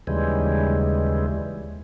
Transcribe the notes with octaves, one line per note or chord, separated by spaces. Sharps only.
D#2 C#3 E3 G3 G#3